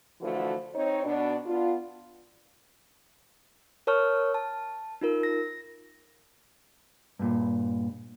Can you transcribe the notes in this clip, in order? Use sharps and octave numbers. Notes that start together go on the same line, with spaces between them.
D3 E3 F3 A3 F#4
C4 D#4 C#5
B2 D4
B3 D4 F4
A#4 C#5 A5 C#6 F6
A5
D#4 F4 A#4
A#6
G2 A#2